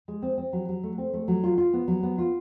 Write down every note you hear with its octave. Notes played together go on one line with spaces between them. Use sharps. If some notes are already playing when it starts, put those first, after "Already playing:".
G#3
C4
C4
F#3
F#3
A3
C4
A3
F#3
F4
F4
B3
F#3
B3
F4